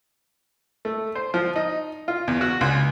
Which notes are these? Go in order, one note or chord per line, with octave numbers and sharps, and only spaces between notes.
A3
C5
F3
D#4
F4
E2
F#4
C#2